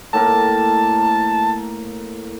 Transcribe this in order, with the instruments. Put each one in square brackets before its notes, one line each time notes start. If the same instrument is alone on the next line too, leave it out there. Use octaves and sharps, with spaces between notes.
[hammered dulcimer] A2 A#3 A#4 [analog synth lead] A5